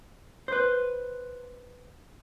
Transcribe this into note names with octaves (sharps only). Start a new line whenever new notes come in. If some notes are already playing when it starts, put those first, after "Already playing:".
B4 C5